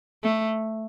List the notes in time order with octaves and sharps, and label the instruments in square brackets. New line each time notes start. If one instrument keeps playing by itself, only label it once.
[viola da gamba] A3